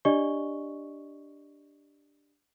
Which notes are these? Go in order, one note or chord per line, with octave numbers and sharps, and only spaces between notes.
D4 G4 D5 D#5 C#6 G7